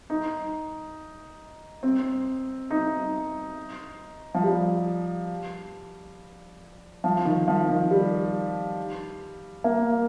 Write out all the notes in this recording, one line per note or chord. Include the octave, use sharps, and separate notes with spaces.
D#4
C4
D#4
F3
G3
F3
D#3
F3
D#3
G3
A#3